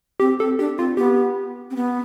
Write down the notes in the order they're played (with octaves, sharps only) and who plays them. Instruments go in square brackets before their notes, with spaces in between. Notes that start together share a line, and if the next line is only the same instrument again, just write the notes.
[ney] C4 [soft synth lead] G4
[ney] C4 [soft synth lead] A4
[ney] D4 [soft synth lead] G4
[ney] C4 [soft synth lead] F4
[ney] B3 [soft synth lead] G4
[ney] C4
B3